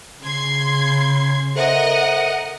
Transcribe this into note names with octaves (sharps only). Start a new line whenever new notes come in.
C#3 C6 G#6 C7
A4 A#4 C5 D#5 E5 F#5